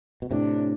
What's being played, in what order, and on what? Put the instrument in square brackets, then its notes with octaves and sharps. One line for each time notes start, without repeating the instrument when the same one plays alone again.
[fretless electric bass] B2
[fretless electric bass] A2 C3 [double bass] D4